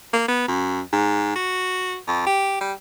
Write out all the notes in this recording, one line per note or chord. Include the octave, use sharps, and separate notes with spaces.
A#3
B3
F#2
G#2
F#4
F2
G4
G3